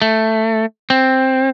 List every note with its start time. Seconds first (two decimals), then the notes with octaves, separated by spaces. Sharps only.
0.02 A3
0.90 C4